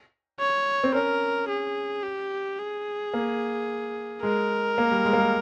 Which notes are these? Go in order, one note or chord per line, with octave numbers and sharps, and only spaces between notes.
C#5
C4
C#4 A#4
G#4
G4
G#4
A#3
G#3 A#4
A#3
G3
G#3
A#3
G#3